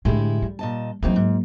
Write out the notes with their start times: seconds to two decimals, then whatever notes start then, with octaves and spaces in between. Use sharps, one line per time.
0.05 A2 D3 G#3 E4 G4
0.42 G3
0.59 A#2 D#5 A5
1.03 E2 F#3 A#3 C4 D#4
1.16 G#2